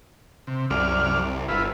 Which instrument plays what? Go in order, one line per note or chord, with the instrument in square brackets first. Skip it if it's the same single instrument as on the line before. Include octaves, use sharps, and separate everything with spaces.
[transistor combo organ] C3
[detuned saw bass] C2 [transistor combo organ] F#2 D5 F6
[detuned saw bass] G1 [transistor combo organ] E4 F4 B4